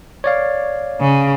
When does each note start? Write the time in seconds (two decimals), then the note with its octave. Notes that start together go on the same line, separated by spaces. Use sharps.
0.24 C#5 D5 F5
1.01 C#3